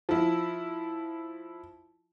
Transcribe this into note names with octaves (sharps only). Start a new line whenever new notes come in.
F3 E4